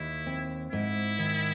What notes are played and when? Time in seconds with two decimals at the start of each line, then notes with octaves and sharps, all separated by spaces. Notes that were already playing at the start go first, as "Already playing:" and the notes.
Already playing: D#2 E4
0.27 C4
0.72 G#2 E4
1.19 D#3